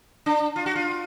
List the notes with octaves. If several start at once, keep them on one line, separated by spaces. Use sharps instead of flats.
D4
F4
F#4
F4